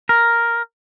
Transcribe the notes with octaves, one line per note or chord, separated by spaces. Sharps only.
A#4